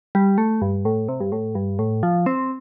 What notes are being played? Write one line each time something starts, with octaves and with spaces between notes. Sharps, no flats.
G3
A3
G2
A2
C3
G2
A2
G2
A2
F3
C4